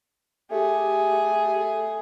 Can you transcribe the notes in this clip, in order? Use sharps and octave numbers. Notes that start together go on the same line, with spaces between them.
A3 G4 G#4